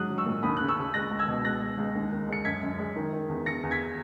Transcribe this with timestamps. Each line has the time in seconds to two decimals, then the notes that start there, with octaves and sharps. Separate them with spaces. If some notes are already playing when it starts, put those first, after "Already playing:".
Already playing: G#2 F#3 D#6 F#6
0.10 F#3
0.18 C#6 E6
0.26 A#2
0.43 D#2 B5 D#6
0.57 C#3 F#6
0.68 C#6 E6
0.78 C#3
0.94 G#3 F#6 A#6
1.11 C#2
1.19 E6 G#6
1.28 B2
1.44 C#2 F#6 A#6
1.62 G#3
1.78 C#2
1.95 D#2
2.12 D#3
2.29 G#3 C#7
2.45 F#2 G#6 B6
2.63 F#2
2.79 G#3
2.96 D#3
3.13 D#3
3.29 E2
3.46 E2 A#6 C#7
3.63 E2
3.71 G#6 B6